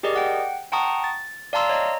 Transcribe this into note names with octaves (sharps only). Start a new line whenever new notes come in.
G4 G#4 A#4 D5 D#5
F#5 G5
F#5 G5 A5 A#5 C#6 D#6
A6
D5 F5 A5 A#5 C6 E6
C#5 D#5 A#5